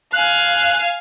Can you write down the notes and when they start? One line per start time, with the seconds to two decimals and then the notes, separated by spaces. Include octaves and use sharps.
0.13 F5 G#5 F#6